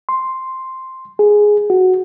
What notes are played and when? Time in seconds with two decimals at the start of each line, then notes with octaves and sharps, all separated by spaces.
0.09 C6
1.19 G#4
1.70 F#4